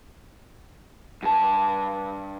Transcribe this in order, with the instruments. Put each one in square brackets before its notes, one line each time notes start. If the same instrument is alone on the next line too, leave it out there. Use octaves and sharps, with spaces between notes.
[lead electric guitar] G2 A5